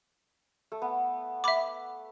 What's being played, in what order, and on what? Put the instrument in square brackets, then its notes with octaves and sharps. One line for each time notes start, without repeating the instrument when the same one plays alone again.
[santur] A3
B3
[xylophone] E5 B5 D6